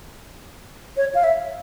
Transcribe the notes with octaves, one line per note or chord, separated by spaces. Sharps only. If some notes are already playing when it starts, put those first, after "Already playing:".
C#5
F5
E5